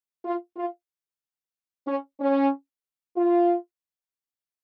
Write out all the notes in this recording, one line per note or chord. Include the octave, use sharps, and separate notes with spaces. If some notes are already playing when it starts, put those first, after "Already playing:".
F4
F4
C#4
C#4
F4